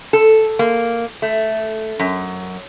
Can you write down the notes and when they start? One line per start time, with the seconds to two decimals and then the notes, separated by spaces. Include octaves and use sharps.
0.13 A4
0.59 A#3
1.22 A3
1.99 F#2